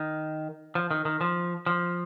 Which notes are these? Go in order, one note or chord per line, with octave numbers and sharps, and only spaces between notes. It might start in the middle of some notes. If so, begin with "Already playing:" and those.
Already playing: D#3
F3
D#3
D#3
F3
F3